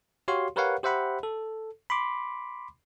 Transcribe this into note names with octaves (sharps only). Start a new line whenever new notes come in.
F#4 G4 C#5 F5 C6
G4 A#4 B4 C#5 F5 F#5
G4 C5 E5 F#5 B5
A4
B5 C6 D6